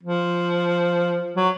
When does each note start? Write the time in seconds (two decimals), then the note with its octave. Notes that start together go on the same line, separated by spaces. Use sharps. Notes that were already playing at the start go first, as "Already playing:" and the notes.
0.04 F3
1.36 F#3